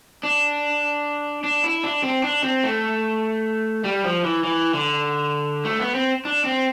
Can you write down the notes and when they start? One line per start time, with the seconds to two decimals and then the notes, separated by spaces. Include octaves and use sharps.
0.23 D4
1.44 D4
1.63 E4
1.84 D4
2.03 C4
2.23 D4
2.44 C4
2.64 A3
3.84 G3
4.04 F3
4.24 E3
4.44 E3
4.74 D3
5.65 A3
5.80 B3
5.95 C4
6.25 D4
6.45 C4